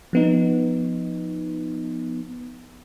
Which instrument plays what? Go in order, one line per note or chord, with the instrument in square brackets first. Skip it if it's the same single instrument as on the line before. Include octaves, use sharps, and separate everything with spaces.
[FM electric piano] F3 B3 D#4